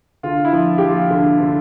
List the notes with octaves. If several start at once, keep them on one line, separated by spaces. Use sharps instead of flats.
D3 F4
E4
F3
F4
F3 G4
F4
D3
D3